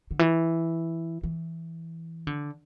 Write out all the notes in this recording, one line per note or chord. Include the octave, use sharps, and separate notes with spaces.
D3
E3
E3
D3